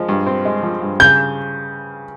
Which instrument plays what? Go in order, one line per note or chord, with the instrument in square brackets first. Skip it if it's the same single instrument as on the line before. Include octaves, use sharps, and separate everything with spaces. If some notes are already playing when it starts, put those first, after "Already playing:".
Already playing: [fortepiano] F3 G#3
G2
C4
G#3
F3
G2
[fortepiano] C#3 [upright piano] G6